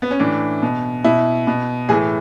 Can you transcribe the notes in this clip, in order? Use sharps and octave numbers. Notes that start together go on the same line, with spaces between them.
B3
C#4
A2 E3 D4
B2
B2 E4
B2
A2 E3 G#4